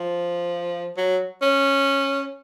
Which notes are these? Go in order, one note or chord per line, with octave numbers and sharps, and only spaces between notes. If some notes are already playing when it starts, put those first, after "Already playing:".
Already playing: F3
F#3
C#4